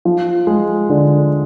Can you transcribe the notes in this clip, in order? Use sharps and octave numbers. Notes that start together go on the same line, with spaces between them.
F3
G#3
D3